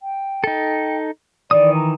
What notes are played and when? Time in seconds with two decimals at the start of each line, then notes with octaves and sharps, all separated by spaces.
0.01 G5
0.44 D#4 A4
1.51 D#3 E3 D5 D#6
1.75 A#5